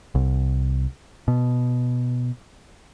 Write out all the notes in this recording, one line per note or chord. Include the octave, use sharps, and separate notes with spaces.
C2
B2